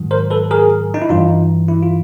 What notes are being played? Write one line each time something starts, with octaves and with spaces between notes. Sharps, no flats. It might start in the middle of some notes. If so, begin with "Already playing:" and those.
Already playing: G#2 D#3 F#3
A#4 C5
A4 B4
G#4 A#4
D#4
E4
G2 E3 D#4 F4
E4
F4